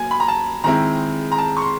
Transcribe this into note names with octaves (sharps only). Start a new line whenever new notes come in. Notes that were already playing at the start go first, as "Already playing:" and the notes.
Already playing: F#3 A#3 G#5
B5
A#5
A5
D#3 G#3 C4 E4 A#5
A#5
A5
C#6
C6